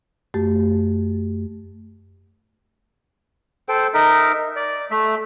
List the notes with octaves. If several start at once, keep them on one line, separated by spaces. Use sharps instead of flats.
F#2 A3 G4
A4 C5 G5
D#4 A#4 E5
D5
A3 E5